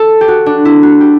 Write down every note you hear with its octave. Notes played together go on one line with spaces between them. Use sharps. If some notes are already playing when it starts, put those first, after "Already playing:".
Already playing: A4
G4
F#4
D4
E4
F#4
G4